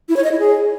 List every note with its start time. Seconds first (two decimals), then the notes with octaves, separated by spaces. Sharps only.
0.09 E4
0.16 C#5
0.24 D#5
0.32 E4
0.39 G#4